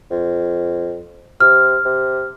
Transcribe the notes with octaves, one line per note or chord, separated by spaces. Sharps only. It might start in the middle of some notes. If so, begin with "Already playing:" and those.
F2
C3 F6
C3